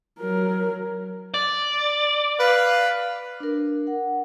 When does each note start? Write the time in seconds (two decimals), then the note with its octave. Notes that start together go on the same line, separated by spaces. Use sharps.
0.20 F#3 A#4
1.34 D5
2.38 B4 F5
3.40 D4 A#4
3.87 F#5